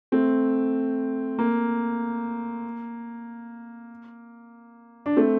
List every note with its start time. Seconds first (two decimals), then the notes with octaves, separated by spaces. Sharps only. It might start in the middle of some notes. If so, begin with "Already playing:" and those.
0.12 A3 C4
1.39 A#3
5.06 D4
5.17 A3 C4